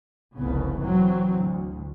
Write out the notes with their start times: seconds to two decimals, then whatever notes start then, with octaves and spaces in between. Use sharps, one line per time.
0.37 F1 C2 C#3 B3
0.80 E3 F#3 C4
1.36 D2